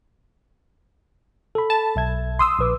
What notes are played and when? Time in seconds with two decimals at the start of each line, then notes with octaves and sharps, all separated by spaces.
1.55 A4 B5
1.70 A5
1.96 B1 E5 G#6
2.39 C6 D#6 E6
2.59 A#1 B4 D6